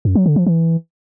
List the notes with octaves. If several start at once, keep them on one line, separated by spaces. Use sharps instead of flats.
F#2
F#3
D3
F3
E3